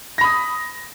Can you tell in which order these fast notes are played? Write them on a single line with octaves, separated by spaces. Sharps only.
A#6 B5 D#6